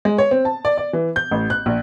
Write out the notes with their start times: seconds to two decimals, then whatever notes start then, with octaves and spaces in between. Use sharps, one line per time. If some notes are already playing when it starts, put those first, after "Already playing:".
0.05 G#3
0.18 C#5
0.31 C4
0.45 A5
0.65 D5
0.78 D5
0.93 E3
1.16 G6
1.31 A1
1.50 F#6
1.66 A#1